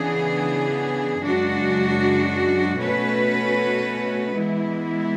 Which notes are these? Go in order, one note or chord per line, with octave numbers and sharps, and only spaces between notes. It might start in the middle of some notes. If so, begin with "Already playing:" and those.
Already playing: C#3 E3 B3 D4 G#4
F#2 C#3 G#3 D4 F#4
B2 A3 C#4 F#4 B4
E3 G#3 B3 E4